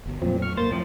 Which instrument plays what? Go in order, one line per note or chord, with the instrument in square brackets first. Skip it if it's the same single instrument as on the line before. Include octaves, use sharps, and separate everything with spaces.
[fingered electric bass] G1 B2
[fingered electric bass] F2 F#3 A3 [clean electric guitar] A#2 [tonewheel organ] F3 C4
[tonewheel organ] C#6 F6
[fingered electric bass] C2 F#2 A#2 [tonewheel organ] A#3 C6 A6 [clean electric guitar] C5
[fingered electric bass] F#2 [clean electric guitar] A2 F3 [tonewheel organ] C4